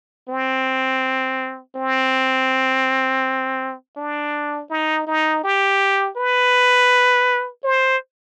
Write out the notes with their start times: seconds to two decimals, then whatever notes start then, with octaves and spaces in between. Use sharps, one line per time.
0.29 C4
1.76 C4
3.97 D4
4.70 D#4
5.07 D#4
5.44 G4
6.17 B4
7.64 C5